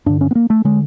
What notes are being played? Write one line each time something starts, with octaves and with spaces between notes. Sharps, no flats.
G2 D3 D4
C#4
B3
A#3
A3
D3 G#3